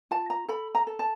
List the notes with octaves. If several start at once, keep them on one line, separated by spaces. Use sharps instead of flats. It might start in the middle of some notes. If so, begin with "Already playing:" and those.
F4 A5
A#5
A4 B5
A#5
A4
A5